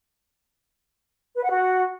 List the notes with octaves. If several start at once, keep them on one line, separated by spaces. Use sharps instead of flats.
B4
F#5
F#4